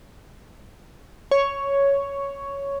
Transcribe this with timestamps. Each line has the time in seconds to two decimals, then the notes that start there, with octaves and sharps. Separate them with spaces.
1.31 C#5